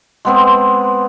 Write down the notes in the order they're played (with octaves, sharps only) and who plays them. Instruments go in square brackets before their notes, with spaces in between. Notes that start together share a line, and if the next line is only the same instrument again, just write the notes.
[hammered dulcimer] G#3 B3 C4